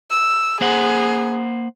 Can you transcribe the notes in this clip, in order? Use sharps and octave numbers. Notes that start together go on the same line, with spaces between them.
E6
A#3 G#4 C5 F#5